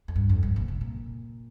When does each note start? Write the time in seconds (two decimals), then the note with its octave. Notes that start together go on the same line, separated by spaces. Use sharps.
0.08 F2
0.16 G2
0.29 F2
0.43 G2
0.56 A#2
0.68 C3
0.81 A#2